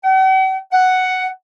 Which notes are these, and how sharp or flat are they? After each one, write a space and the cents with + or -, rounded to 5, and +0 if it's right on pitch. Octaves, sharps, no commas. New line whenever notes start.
F#5 +45
F#5 +5